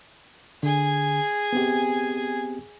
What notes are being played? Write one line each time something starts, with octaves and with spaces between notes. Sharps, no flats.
D3 G#4 G#5
B3 C4 G4